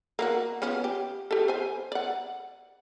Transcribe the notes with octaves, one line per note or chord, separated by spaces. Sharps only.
A#3 C4 F#4
F3 B3 C#4
G4
G4 A4
C5 G#5
D5 F#5